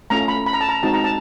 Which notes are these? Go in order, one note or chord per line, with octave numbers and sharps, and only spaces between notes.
A3 C#4 F4 A#5
B5
B5
A#5
A5
A#5
G#3 C4 D#4 F#4 A5
A#5
A5